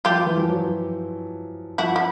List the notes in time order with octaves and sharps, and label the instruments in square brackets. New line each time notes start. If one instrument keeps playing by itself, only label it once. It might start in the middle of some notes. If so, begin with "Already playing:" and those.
[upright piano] F3 [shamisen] F4 G4
[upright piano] E3
F3
F#3
[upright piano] F3 [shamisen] E4 F#4
[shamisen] E4